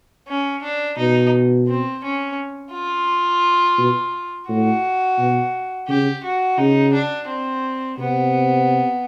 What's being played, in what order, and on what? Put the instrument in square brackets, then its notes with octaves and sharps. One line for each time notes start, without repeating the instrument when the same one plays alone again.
[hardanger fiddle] C#4
D4
[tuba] B2 [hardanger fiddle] D#4
[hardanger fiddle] C4
C#4
F4
[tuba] B2
[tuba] A2 [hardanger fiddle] F#4
[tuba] B2
[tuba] C#3 [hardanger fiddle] G4
[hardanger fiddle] F#4
[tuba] C#3 [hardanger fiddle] D#4
[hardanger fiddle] D4
C4
[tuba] C3 [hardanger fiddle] B3